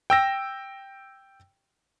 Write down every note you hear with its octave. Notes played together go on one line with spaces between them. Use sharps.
G5 E6 A#6